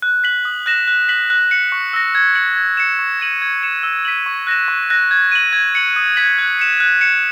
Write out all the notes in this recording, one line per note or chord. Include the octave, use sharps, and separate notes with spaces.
F#6
B6 F#7
D#6
F#6 A#6 E7
F#6
B6 F#7
F#6
C#7 F#7
C#6
E6 A#6
G#6
C#7 F#7
G#6
C#7 E7
C#6
G#6 D#7 F#7
G#6
C#7 E7
E6
B6 D#7 F#7
C#6
F#6 A#6 E7
C#6
F#6 A#6
G#6
D#7 F#7
G#6
C#7 F#7
D#6
G#6 B6 F#7
F#6
C#7 E7
F#6
C#7 E7